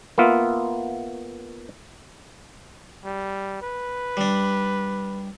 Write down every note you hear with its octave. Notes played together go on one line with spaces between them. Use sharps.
A#3 B3 F4 E5
G3
B4
G3 D4